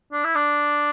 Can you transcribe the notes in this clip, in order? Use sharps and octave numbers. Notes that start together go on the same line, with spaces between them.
D4
E4
D4